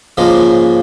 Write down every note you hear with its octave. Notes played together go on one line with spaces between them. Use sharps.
G#2 C#3 F3 G#3 A#3